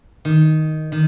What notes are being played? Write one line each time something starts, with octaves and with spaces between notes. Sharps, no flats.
D#3
D#3